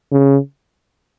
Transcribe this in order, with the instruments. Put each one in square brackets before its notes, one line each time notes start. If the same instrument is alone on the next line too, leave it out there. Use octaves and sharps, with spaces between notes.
[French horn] C#3